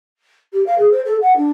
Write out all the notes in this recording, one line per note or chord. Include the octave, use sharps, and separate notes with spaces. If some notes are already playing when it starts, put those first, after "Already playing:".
G4
F5
G#4
C5
A4
F#5
D4